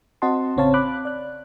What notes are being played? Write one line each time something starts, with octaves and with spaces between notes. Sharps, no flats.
C4 F#4 D#5 F#5 A5 C6
A1 C#3 C4 C#5 F5 A5
B5 D6 F#6
D5 F#6